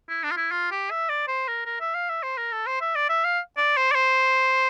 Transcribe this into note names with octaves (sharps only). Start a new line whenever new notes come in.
E4
D4
F4
E4
F4
G4
E5
D5
C5
A#4
A#4
E5
F5
E5
C5
A#4
A4
C5
E5
D5
E5
F5
D5
C5
D5
C5